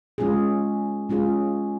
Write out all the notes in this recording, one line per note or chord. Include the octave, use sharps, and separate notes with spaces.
G#3 C#4 F4 G#4
G#3 C#4 F4 G#4